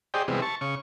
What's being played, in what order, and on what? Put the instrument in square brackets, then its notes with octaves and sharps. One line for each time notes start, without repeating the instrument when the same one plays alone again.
[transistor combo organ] G4 G#4 C5 D5 D#5 G5
C3 E3 G3 G#3 B3 C4
A5 C#6
C#3 C#6